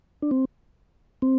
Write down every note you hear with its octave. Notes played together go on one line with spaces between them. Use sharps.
D4
C4
C4